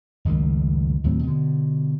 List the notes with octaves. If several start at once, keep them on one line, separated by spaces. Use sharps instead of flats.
F#1 C#2 A2 D#3
D#2 A2 F#3 C4
B2 D3